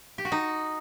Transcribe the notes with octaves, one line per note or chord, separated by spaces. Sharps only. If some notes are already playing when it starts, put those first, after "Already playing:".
G4
F#4
D#4